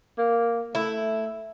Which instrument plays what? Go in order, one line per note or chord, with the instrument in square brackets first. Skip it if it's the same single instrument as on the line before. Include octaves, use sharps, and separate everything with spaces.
[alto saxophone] A#3
[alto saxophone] A3 [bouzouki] E4